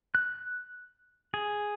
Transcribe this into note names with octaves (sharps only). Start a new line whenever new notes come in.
F#6
G#4